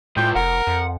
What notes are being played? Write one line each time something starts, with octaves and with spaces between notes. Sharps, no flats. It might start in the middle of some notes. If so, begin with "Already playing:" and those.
A2 G#3 F4 G5
F1 A#4 F#5
F2